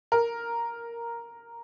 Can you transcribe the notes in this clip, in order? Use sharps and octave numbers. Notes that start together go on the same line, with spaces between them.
A#4